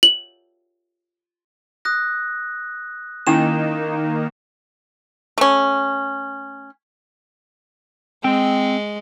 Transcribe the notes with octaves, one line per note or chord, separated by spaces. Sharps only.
F#7
D#6 F#6 A#6
D#3 A#3 C#4 D#4 E4 G5 E7
A3 C#4
G#3 C4 G5